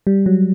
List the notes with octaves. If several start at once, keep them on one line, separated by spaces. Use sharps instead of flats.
G3
F#3